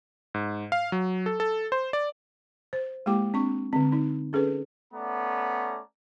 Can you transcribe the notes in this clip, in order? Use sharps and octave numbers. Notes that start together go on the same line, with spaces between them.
G#2
F5
F#3
A4
A4
C5
D5
C5
G#3 A#3 E4 G4 G5 D6
C4 D4 C#6
D3 C4
D#4
C#4 G#4 A4 B4
A3 B3 C#4 D5 A#5